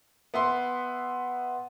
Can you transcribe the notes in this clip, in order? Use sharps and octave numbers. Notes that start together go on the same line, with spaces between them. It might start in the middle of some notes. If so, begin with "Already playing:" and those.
B3 E5 C6